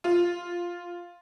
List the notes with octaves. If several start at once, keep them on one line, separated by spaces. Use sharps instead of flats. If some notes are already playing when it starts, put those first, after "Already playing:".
F4